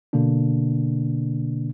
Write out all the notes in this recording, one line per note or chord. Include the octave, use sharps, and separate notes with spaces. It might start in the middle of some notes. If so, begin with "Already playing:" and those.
B2 D3 A#3 D4